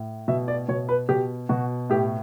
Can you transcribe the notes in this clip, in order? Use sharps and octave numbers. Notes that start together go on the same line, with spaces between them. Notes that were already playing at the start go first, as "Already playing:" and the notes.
Already playing: A2
B2 E5
D5
B2 C#5
B4
B2 G4
B2 F#4
A2 G4